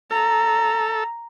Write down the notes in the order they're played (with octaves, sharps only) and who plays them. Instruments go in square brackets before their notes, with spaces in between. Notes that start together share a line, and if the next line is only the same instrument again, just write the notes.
[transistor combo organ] A4 [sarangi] A#5